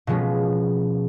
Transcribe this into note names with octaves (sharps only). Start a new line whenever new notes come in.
B2 F3 G#3 B3 C#4